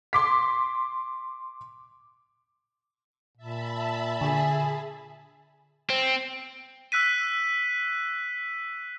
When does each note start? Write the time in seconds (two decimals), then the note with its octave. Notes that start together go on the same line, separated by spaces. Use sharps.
0.13 C6 D6 B6
3.37 A#2 E5 A5 B5
4.21 D3 G#4
5.90 C4
6.92 E6 F#6 B6 D#7